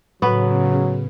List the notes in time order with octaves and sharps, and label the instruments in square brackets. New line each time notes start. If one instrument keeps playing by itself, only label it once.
[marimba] A2 [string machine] C#3 [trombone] F#3 [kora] B3 B4